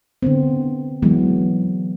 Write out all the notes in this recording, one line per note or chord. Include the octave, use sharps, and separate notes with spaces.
D3 B3 C4
E3 F#3 G#3 B3